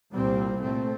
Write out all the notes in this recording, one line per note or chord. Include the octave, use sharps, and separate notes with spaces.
C2 A#2 G3 C4
A#2 A3 C4